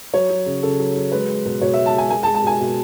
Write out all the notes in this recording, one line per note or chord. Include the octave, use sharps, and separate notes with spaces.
F#3 C#5
F#3
C#3
C#3 A4
F#3
F#3
G#3 B4
G#3
B2
B2 C#5
E5
G#3
A5
G#3 G#5
G#3 G#5
A5
G#3
A5
B2 G#5
B2